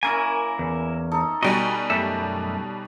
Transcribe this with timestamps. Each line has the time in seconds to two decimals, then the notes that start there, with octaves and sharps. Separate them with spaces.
0.03 A#3 C#4 E4 A#4 E5 G#5
0.59 E2
1.12 D#4 A4
1.43 B2 G3 F#4 D#5 G5 G#5
1.90 F#2 A3 G4 E5